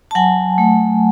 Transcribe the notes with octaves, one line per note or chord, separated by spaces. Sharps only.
A5
F#3 F#5 G#5
A3